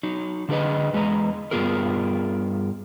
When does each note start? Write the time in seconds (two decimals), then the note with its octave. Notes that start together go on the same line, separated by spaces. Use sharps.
0.03 F#3 D#4
0.49 D3 D4 G#4 A#4 B4 D#5
0.93 E2 G#3 B4 D#5 A#5
1.51 G2 B3 F4 G#4 A#4